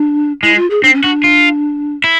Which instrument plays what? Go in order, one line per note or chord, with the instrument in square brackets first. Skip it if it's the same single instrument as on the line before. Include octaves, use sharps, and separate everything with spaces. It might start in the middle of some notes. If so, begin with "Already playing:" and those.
Already playing: [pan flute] D4
[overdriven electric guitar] G#3 [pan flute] E4
[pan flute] F4
G#4
[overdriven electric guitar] C4 [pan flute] D4
[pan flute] C#4
[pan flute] D4 [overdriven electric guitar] F#4
[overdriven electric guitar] F4
E4